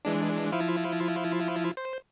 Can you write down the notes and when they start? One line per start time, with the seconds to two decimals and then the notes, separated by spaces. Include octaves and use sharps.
0.05 E3 G#3 D4
0.52 F3 E4 F4
1.77 C5